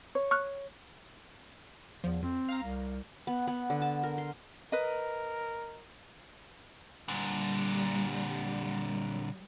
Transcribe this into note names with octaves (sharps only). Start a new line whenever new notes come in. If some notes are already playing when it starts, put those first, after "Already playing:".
C#5
C#6 F6 F#6
E2 F3
F2 C4
F5 A#5
C2
B3
B3
D3
A5
A#4
C6
A#4 B4 D#5
A#2 D3 G3